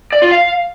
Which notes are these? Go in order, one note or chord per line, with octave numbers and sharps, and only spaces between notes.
D5
F4
F5